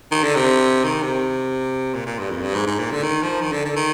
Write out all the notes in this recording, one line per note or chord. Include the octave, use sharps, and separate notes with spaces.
D#3
D3
C3
D#3
C3
A#2
A#2
G2
F2
G2
G#2
G#2
A#2
D3
D#3
F3
D#3
D3
D3
D#3